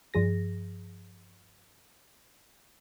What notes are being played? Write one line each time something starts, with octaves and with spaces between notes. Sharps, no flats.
G2 F3 G#4 A#6